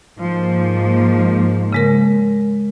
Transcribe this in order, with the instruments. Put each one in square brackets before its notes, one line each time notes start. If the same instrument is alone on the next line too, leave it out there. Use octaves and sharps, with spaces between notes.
[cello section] G#2 F3 A#3
[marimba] C#3 G#3 A#4